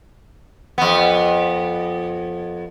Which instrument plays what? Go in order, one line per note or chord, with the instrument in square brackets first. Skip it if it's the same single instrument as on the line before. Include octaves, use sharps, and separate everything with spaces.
[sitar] F2 B3